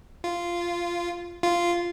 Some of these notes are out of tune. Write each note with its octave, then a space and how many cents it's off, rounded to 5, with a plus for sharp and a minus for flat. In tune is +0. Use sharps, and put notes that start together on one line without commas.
F4 -10
F4 -10